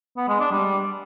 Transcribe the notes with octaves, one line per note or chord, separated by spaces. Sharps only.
B3
G#3
D4
G3